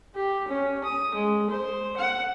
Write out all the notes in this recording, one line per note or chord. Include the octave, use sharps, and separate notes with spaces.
G4
C#4
D#6
G#3
C5
F#5